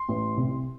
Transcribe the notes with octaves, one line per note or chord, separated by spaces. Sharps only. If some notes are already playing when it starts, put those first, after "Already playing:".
Already playing: C6
A1
C2